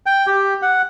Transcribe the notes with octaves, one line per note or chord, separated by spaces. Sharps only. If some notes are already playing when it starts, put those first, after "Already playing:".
G5
G4
F#5